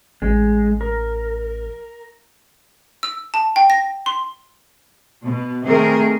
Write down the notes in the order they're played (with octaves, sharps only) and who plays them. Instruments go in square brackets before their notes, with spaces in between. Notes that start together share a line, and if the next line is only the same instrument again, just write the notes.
[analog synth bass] A1 [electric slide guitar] G#3
[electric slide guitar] A#4
[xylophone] E6
A5
G5
A#6
C6
[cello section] B2
C3 D#3 A3 G#4 A#4